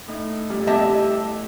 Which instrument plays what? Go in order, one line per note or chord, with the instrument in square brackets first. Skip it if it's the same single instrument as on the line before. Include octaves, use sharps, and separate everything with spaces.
[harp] A2 D#4
[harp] F2 [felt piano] G3
[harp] E2 E6 [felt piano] G4 [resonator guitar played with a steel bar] D#5 E5 A5